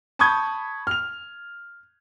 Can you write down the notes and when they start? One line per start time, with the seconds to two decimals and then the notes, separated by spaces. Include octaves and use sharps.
0.19 A5 B5 C#6 D#6 G6 G#6
0.87 F6 F7